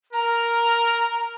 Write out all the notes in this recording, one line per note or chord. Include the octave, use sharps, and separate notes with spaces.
A#4 A#5